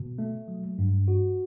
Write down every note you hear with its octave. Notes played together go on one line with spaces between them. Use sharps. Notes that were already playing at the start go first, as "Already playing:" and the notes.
Already playing: B2
A3
F#3
G2
F#4